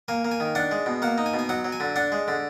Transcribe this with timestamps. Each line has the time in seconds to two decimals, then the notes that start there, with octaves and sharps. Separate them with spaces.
0.08 A#3 G#5
0.25 A#3
0.31 G#5
0.40 D#3
0.55 D4 F#5
0.71 G#3
0.86 B2
1.02 A#3 F#5
1.18 D#4
1.26 G#5
1.34 B2
1.39 G#5
1.49 F#3 F#5
1.65 F#3
1.72 G#5
1.80 D3
1.96 D4 F#5
2.12 G#3
2.28 D3